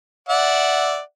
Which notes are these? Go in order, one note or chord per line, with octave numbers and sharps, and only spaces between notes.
D5 E5 F#5